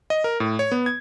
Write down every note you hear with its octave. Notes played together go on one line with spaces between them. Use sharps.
D#5
A#4
A2
C#5
B3
G#6